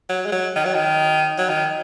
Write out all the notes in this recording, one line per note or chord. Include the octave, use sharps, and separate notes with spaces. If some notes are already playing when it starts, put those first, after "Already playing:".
F#3
G#3
F#3
D#3
F#3
D#3
F#3
D#3